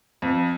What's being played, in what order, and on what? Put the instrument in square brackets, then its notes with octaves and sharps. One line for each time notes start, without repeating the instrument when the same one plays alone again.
[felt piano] F2